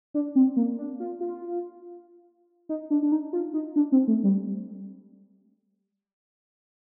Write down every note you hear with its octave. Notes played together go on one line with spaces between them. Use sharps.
D4
C4
A#3
D4
F4
F4
D#4
D4
D4
D#4
F4
D#4
D4
C4
A3
G3